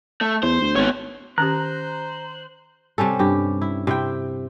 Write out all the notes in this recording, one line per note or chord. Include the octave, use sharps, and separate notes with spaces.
A3
E2 C5
D2
G#1 B3 C#5
D#3 C#4 G4 C5 A#5 F#6
C3 G3 C#4 A4
G2 G4
E4
C3 E4 G5